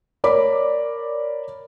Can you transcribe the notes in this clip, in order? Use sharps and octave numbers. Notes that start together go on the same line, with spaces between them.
A#4 C#5 D5 B5 D6